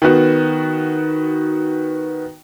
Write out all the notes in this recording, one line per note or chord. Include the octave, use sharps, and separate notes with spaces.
D#3 B3 F#4